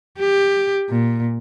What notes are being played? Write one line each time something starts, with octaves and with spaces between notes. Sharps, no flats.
G4
A#2